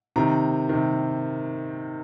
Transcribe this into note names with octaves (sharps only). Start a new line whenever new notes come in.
C3 D#3 A#5
C3 D#3